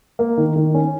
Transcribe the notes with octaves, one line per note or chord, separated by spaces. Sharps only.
A#3
D#3
D#3
C#4